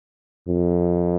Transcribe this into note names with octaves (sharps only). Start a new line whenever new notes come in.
F2